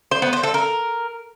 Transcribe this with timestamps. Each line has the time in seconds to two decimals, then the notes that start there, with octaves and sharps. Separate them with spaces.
0.11 C5
0.22 B3
0.33 C5
0.43 A4
0.54 A#4